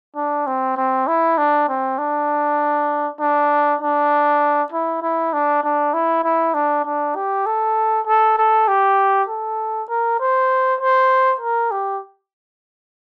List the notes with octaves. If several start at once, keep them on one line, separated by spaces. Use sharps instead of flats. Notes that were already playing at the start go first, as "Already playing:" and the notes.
D4
C4
C4
E4
D4
C4
D4
D4
D4
E4
E4
D4
D4
E4
E4
D4
D4
G4
A4
A4
A4
G4
A4
A#4
C5
C5
A#4
G4